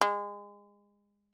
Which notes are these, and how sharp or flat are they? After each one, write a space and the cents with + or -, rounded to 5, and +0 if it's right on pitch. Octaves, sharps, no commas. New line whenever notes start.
G#3 -30